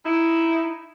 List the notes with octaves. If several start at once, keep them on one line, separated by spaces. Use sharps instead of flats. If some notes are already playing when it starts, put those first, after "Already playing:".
D#4 E4